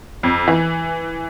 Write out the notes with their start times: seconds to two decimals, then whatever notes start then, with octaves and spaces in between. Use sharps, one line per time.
0.23 F2
0.48 E3